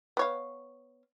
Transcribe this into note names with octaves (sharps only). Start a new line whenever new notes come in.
B3 C#5 F5